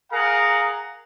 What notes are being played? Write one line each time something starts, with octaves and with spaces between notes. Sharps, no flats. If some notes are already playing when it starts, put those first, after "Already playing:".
G#4 A#4 F5 F#5 A#5